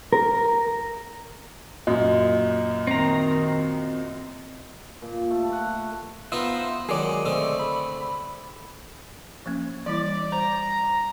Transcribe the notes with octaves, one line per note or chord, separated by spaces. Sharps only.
A#4
F#2 A#2 D#5
D#3 C4 A#5
A#2
A3
F#5
B3 D#4 F4 C5 E5
D#3 F#3 G#3 G#4 D5 D#5
D3 A3 C4
B5
F3 A#3 C#4
E3 G3 E4 D5
C5 A#5